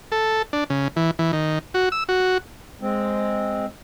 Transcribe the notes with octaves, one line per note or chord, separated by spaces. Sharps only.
A4
D4
C#3
E3
E3
D#3
F#4
E6
F#4
G#3 C4